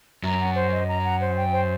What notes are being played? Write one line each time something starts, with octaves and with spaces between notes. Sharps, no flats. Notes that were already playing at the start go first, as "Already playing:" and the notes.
F#2 A#5
F#5
C5
D#5
A#5
F#5
C5
G5
C5